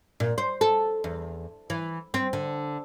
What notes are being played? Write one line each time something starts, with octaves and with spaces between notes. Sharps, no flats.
A#2
C5
A4
E2
E3
C4
D3